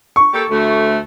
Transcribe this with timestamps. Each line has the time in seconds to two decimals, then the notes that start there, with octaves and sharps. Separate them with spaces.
0.16 C#6
0.33 A#3 G4 A4
0.49 D2 A3